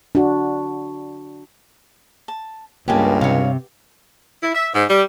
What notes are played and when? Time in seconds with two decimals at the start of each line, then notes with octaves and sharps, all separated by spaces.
0.15 D4 F#4
2.28 A5
2.88 C#2 G2 A#3 B3 G4 G#5 A5
3.21 C3 C#5 F5
4.43 E4
4.54 E5
4.74 G#2
4.90 G3